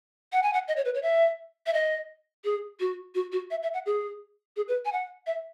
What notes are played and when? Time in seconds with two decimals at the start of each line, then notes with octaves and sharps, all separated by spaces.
0.33 F#5
0.43 G#5
0.53 F#5
0.68 D#5
0.76 C#5
0.85 B4
0.94 C#5
1.03 E5
1.66 E5
1.74 D#5
2.44 G#4
2.80 F#4
3.15 F#4
3.32 F#4
3.51 E5
3.63 E5
3.74 F#5
3.86 G#4
4.56 G#4
4.68 B4
4.85 G#5
4.92 F#5
5.27 E5